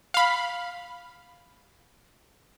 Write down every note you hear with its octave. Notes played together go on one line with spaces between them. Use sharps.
F5 B5